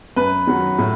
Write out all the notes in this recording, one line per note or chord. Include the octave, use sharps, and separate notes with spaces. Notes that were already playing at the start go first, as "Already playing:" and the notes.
F#2 B4
D#3 F#3
A2